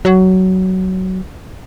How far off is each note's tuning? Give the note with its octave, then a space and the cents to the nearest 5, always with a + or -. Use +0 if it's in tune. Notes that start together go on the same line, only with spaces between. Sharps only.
F#3 +15